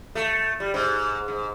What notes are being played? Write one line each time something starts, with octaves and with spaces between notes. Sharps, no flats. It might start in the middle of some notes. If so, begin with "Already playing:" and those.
A3
G3
G#2
G#2